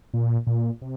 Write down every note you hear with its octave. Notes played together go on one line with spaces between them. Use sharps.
A#2
A#2
C3